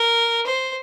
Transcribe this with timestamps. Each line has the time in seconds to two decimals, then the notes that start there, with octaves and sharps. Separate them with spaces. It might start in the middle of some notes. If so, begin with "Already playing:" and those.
Already playing: A#4
0.46 C5